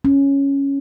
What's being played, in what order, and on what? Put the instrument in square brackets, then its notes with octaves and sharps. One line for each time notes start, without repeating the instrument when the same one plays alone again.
[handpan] C#4